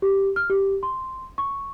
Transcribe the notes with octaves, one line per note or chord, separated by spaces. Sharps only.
G4
F6
G4
C6
C#6